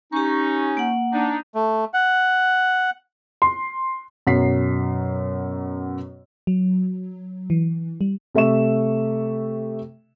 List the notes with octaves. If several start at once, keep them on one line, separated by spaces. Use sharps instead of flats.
C#4 D#4 G4 C#6
A#3 F#5
D4 D#4
A3
F#5
C6
F#2 B2 F#3 B6 C7
F#3
E3
G3
C3 A3 E5 C#6 E7